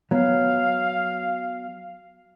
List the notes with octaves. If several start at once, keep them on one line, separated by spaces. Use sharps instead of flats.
F#3 B3 F5